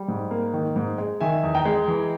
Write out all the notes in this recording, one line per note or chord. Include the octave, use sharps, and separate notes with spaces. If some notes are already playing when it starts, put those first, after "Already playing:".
Already playing: G3
G#2
A#3
D#3
G#2
G#3
D#3 E5 G#5
E2
G5 A#5
G#3
E3